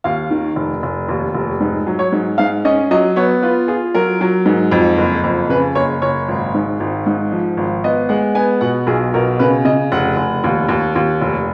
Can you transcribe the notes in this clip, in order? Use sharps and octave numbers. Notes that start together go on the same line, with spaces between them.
D#2 F5
D#3
F1
F1
D#2
F1
G#2
F#3
C#5
G#2
G#2 F5
C#4 D#5
F#3 D#5
B3 C#5
F4 B4
F4 G#4
F#3 A#4
F#3
G#2
F2
F#1
F2
C#3 B4
F#1 C#5
F#1 C#5
G#1
G#2
G#1
G#2
F3
G#1
B3 D#5
G#3 F#5
B3 G#5
B2 F#5
B1 G#4
B2 A#4
C#3 B4
C#3 D#5
F1 F#5
F1
D#2
D#2
D#2
F1